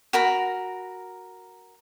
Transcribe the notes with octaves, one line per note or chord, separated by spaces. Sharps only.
F#4 A#4 B5